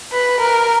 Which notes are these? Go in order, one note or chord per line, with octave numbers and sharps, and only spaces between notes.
B4
A#4